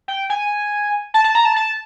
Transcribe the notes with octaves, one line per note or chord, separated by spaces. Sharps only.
G5
G#5
A5
A5
A#5
A5
A5